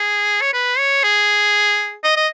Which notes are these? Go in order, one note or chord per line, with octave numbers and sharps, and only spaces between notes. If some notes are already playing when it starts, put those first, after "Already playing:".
Already playing: G#4
C#5
B4
C#5
G#4
D#5
D#5